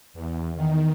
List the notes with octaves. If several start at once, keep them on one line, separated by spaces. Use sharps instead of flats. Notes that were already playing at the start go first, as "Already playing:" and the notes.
E2
D#3